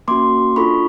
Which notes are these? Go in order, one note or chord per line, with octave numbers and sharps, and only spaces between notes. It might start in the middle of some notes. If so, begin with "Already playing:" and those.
A#3 C#4 F#4 C6 D6
D4 F4 A4 B5 C#6